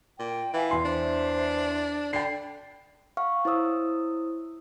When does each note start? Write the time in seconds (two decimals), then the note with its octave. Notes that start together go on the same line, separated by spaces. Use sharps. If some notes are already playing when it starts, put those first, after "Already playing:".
0.19 A#2 G5
0.54 E3 E5 F5 G#5
0.71 E2 C6
0.85 D4 C5 E5
2.13 D3 D5 G5 B5 C7
3.17 F5 F#5 C#6 F6
3.45 E4 C5 C#5 D#6 E6